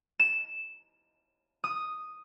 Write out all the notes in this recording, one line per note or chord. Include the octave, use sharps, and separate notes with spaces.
E7
D#6